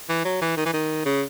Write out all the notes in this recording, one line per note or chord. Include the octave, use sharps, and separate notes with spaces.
E3
F#3
E3
D#3
E3
D#3
C#3